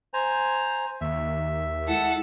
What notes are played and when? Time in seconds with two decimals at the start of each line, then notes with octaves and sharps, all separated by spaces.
0.14 C5 G#5 A#5
1.01 D#2 E5
1.88 G#3 E4 A4 F#5